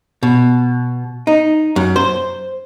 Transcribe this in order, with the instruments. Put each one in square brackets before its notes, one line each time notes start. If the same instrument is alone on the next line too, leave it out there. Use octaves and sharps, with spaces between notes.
[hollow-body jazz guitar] B2
D#4
F#2
C5